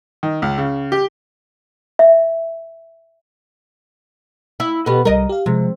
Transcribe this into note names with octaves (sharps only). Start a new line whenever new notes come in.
D#3
C#2
C#3
G4
E5
E4
B2 B3 G4 A4
C2 G3 A#4 D#5
G4 F5
C3 F3 G#3